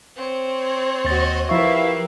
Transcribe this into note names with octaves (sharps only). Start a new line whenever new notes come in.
C4 C#5
D#2 F#4 C5 D#5 A6
F3 E4 G4 A#4 B4 E5 F5 C#6